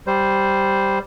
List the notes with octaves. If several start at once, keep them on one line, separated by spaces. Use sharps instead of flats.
G3 C5